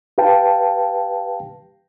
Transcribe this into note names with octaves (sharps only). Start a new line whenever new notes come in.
G4 B4 F5 G5 A5